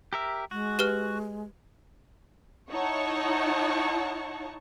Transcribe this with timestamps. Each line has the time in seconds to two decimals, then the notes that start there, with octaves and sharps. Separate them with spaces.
0.13 G4 A#4 E5
0.51 G#3 F#4
0.79 G4 B4 F6
2.70 D#4 E4 C#5 F#5 A5 C#6